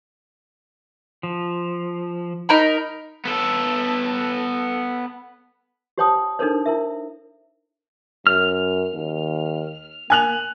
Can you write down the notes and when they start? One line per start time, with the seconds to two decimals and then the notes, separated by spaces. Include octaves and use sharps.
1.23 F3
2.49 D#4 A#4 B5
3.25 B3 A4
5.98 G4 C5 C#5 G5 A5 D#6
6.39 D4 D#4 A4 A#4 C5 C#5
6.66 E4 A#4 E5
8.27 F#2 F6
8.94 D#2
10.10 A#3 G#5 F#6 F7